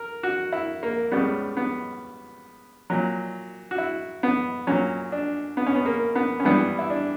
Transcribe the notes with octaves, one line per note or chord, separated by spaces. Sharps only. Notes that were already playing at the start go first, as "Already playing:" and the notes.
Already playing: A#4
F#4
E4
A#3
C#2 C#3 G3 B3
B3
A#2 F#3
F#4
E4
B3
A#2 F#3 C#4
D4
B3
C#4
B3
A#3
B3
C#4
G2 E3 G3 B3
E4
D4